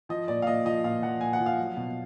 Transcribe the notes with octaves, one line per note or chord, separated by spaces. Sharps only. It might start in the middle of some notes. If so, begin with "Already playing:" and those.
F3 D#5
A#2 D5
F5
A#2 D#5
F3 D#5
A#2 F5
F3 F#5
A#2 G#5
F#5
F3
F5
F#3
B2